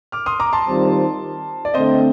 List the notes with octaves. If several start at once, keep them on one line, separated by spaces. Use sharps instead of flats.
D6 F6
C6 D#6
A#5 D6
A5 C6
D#3 G3 C4 F4 C5
D5
D3 A3 C4 C5 D#5